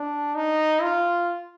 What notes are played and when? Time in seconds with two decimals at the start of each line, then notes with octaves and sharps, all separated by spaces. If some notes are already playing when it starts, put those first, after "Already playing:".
Already playing: D4
0.35 D#4
0.82 F4